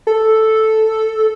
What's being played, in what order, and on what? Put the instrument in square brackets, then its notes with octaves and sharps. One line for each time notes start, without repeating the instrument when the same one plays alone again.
[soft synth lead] A4